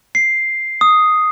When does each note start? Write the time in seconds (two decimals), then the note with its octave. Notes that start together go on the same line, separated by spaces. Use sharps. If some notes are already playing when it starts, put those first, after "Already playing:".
0.15 C7
0.81 D#6